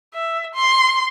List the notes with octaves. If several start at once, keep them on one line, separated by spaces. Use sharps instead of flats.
E5
C6